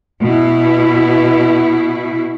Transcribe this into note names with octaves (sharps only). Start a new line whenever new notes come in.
B2 E4